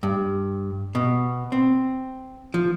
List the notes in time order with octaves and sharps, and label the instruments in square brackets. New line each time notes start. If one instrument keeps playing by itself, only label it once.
[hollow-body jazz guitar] G2
B2
C4
F3